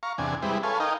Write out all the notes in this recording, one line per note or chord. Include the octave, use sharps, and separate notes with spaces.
F5 A#5 C#6
E2 C3 D4 G#5
G3 G#3 C4 E4 B4
A4 B4 C#5 F5 G#5
D#4 A#4 D#5 F5 G5